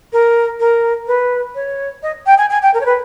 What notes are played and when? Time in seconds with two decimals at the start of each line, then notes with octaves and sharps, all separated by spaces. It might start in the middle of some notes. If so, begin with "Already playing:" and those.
0.12 A#4
0.59 A#4
1.07 B4
1.55 C#5
2.02 D#5
2.26 G5
2.38 G#5
2.50 G#5
2.62 G5
2.73 A#4
2.80 C#5
2.85 B4